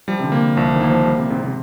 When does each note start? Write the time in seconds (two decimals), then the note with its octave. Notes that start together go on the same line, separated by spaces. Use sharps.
0.08 F3 G3
0.19 C3
0.24 D3
0.32 A#3
0.57 C2 F3
0.73 D#3
0.81 A#3
0.89 F3
1.06 G3
1.18 C3
1.30 G#2 C3
1.42 C3